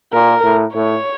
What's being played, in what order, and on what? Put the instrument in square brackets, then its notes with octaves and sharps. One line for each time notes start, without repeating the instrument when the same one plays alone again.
[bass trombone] A#2 [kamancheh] A#4
[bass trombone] A2
[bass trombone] A2 [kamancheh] C#5